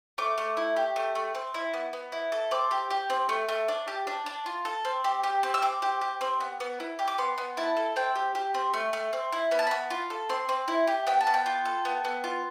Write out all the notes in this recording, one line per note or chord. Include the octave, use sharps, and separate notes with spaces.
A3 D6
A3
E4
G4
A3
A3
C4
E4
B3
B3
E4
A4
C4 D6
G4
G4
C4
A3
A3
D4
G4
D4
D4
F4
A4
C4
G4
G4
C4
E6
C4 D6
G4
G4
C4
B3
B3
E4
G4
D6
B3 C6
B3
E4 A5
A4
C4 G5
G4
G4
C4
A3
A3
C4
E4
B3 B5
A5
B3 B5
F4
A4
C4 C6
C4
E4
G4
B3 G5
A5
B3
G5
F4
A4
B3
B3
F4